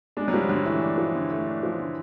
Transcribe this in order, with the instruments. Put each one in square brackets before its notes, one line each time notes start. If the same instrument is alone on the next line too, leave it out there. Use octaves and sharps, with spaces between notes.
[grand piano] G#3 [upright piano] D4
[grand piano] F#3
[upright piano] F3 [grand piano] G3
[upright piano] D3 [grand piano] F#3
[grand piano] E3 [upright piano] A3
[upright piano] D4
F3
D3
A3
D4
F3
D3